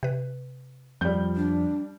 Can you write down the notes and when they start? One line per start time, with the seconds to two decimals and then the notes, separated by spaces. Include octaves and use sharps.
0.03 C3 B4
1.01 F2 F3 G3 G6
1.36 D4